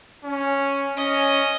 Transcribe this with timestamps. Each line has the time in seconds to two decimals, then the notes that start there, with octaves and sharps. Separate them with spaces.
0.25 C#4
0.97 C#4 D#5